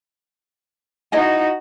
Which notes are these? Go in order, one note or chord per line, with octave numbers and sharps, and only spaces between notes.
D#4 E4 F#4 D#5 G#5